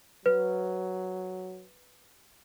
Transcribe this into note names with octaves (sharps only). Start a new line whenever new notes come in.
F#3 B4